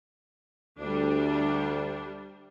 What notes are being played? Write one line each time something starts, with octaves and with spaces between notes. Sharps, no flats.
D2 G3 D4